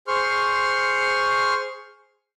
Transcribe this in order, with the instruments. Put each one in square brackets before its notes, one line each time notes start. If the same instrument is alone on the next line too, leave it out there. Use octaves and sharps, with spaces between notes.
[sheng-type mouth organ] G#4 C5 C6 C#6 F6